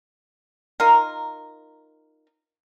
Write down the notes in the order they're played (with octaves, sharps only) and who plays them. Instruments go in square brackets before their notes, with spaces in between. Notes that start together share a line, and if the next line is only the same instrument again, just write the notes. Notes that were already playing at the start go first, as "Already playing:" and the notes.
[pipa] D#4 F4 A#4